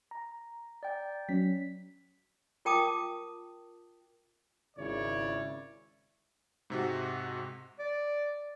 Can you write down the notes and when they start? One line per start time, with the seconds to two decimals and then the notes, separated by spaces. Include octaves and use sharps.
0.11 A#5
0.83 D5 G5
1.29 F#3 C#4 B6
2.65 F4 A#4 G5 A5 D6 D#6
4.77 G#1 C#3 E4 C#5 D5
6.70 G#2 C3 F#4
7.79 D5